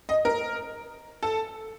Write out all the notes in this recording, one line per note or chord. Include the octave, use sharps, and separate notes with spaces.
D#5
A#4
A4